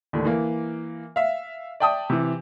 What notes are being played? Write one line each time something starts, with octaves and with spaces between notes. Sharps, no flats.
D#2 A2 D3
E3 A#3
E5 F5
D5 E5 G5 A5 D#6
C3 E3